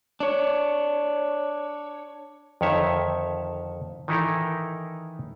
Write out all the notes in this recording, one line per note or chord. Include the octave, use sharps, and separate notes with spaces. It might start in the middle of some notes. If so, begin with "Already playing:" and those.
D4 C#5
F2 D3 D#3 C#5 E5
D#3 E3 D#4 E4 A4 A#4